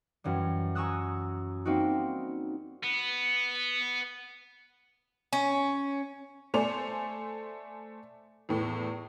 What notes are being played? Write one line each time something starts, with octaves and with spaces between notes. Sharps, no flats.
F#2 E3 G3
G#5 A#5 C#6 D#6 E6 F#6
G3 A#3 C4 D#4 F#4
B3
C#4
A3 C5 D5 G#5 F7
E2 A2